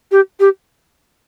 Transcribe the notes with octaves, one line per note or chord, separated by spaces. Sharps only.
G4
G4